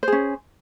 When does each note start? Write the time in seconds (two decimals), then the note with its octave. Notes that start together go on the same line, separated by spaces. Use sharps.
0.03 C5
0.08 G#4
0.12 C#4